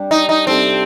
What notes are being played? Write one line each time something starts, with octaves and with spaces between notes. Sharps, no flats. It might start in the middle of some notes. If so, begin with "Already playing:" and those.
Already playing: G3 D4 G4
D#4
D#4
C3 G3 C4 D4 A4